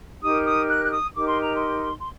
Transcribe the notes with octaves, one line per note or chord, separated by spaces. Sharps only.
D#4 G4 A#4 D#6
D#6
F#6
F#6
D#6
D#4 G4 A#4 D6
C6
A#5
C6
C6